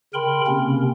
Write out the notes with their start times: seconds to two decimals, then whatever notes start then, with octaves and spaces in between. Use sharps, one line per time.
0.14 C#3 A#4 G5 B5 C6
0.47 C3 A#3 C4 C#4